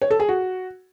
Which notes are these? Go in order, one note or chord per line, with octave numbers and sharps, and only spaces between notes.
C#5
A4
G#4
F#4